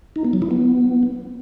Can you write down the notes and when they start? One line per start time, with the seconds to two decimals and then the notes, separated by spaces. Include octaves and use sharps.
0.16 D#4
0.24 B3
0.33 F#3
0.42 E4
0.51 B3